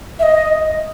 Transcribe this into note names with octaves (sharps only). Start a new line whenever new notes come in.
E5
D#5